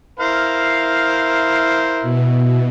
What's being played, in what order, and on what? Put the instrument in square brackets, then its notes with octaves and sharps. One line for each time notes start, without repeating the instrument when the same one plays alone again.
[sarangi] E4 [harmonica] A#4 C5 F5
[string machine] B2